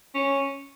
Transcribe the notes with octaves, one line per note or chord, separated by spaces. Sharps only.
C#4